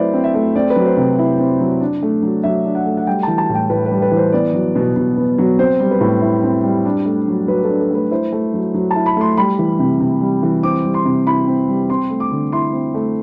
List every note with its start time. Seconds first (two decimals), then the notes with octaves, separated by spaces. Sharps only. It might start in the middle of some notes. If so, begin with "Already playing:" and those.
Already playing: F#3 A3 C4 E4 B4 C5 D5
0.14 C4
0.24 E5
0.34 A3
0.56 C4 D5
0.70 B4
0.76 F#3
0.86 C5
0.97 C3
1.19 E4
1.39 C4
1.60 F#3
1.81 D4
2.03 A3
2.22 F#3
2.43 F#3 E5
2.65 D4
2.75 F#5
2.86 A3
2.97 F#5
3.07 G3 G5
3.23 E3 A5
3.38 A5
3.50 A2
3.55 G5
3.70 A2 B4
3.86 B4
3.92 G3
4.02 B4
4.11 E3
4.17 C5
4.33 B3 D5
4.54 F#3
4.76 B2
4.96 B2
5.17 B3
5.38 F#3
5.59 C4 C5
5.80 G3
5.91 B4
6.01 A2
6.22 E4
6.43 C4
6.64 G3
6.85 D4
7.06 A3
7.28 F#3
7.48 F#3 B4
7.64 A4
7.69 D4
7.80 A4
7.91 A3 B4
8.11 E4 C5
8.33 A3
8.54 F#3
8.74 F#3
8.91 A5
8.96 E4
9.06 B5
9.17 A3 C6
9.37 G3 B5
9.59 E3
9.79 C3
10.00 C3
10.21 G3
10.43 E3
10.63 C4 D6
10.84 G3
10.94 C6
11.05 C3
11.26 E4 B5
11.47 C4
11.68 G3
11.90 C4 C6
12.10 A3
12.20 D6
12.31 D3
12.52 E4 C6
12.73 C4
12.94 A3